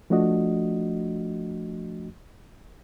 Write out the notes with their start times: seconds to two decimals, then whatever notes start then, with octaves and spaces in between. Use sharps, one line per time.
0.10 F3 A3 D4 F#4 D#5